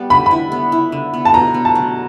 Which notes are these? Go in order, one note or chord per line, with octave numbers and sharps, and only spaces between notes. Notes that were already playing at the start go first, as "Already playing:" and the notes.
Already playing: G3 B3
D3 B5
E4 B5
B3
E4
D3
B3
A5
B2 A#5
B3
A5
F#3